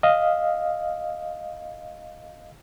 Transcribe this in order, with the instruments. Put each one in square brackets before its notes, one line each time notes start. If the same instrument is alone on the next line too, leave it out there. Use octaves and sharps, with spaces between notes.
[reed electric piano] D#5 F5